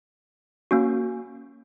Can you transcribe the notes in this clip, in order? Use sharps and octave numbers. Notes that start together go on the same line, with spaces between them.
A#3 C#4 F#4